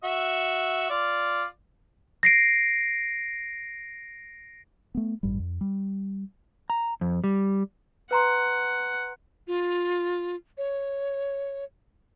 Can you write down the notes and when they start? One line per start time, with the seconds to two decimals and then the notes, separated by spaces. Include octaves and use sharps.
0.04 F#4 E5
0.90 F4 D5
2.23 A#6 C7 D7
4.95 A3 B3
5.23 A1 G2 G3
5.39 F2
5.61 G3
6.70 A#5
7.01 F2
7.24 G3
8.11 B4 F#5 A#5 C6
9.47 F4
10.58 C#5